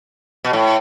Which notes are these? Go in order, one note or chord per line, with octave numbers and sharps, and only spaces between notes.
B2
A2